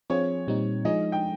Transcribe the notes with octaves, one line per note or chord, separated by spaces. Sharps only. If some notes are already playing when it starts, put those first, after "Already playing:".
F3 C4 F4 G#4 C#5
A#2 G3 C4 D#4
F3 G#3 D#4 G#4 D#5
G5